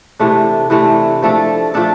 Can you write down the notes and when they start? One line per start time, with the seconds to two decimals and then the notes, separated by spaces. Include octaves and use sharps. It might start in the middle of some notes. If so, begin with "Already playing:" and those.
0.19 C3 E3 A3 D4
0.70 C3 E3 A3 D4
1.22 F3 A3 D4 A4
1.74 F3 A3 D4 A4